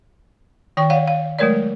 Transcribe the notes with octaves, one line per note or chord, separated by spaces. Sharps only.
D#3 G5 C#6
C#5 D5 F5 F#5
F5
F#3 G#3 A3 A#4 C#5 D5